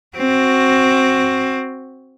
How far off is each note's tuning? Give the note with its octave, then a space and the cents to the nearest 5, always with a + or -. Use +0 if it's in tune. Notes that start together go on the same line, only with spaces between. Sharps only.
C4 +10 F#4 +0